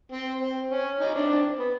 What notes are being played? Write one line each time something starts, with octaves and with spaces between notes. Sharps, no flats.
C4
C4
C#4
C#4 D#4
C4 D4
C4 D4
B3